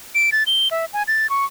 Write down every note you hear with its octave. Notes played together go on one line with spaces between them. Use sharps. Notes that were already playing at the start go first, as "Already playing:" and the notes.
D7
A6
G7
E5
G#5
A6
C#6